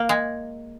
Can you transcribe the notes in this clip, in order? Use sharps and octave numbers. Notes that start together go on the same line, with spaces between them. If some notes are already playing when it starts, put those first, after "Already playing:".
Already playing: A#3
G#3